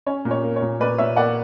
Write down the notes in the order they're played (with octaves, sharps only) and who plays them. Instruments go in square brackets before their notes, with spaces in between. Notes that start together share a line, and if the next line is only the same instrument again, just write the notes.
[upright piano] C#4 C#5
A#2
C#5
A#3
C#5
A#2
A#2 B4 D5
A#2 C#5 E5
A#3 D5 F#5